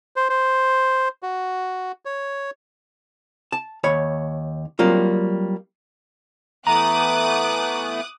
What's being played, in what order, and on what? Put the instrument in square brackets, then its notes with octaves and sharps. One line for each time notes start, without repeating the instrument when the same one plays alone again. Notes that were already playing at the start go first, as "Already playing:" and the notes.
[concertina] C5
C5
F#4
C#5
[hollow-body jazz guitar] A5
D#2 C#5 B5
F#3 G3 A#3 C4 F4
[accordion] E3 A3 B3 [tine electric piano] A#5 [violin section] D6 D#6 F#6